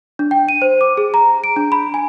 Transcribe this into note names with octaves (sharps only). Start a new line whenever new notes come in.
D4
G5
D#7
C5
D6
G#4
A#5
D7
D4
B5
G#5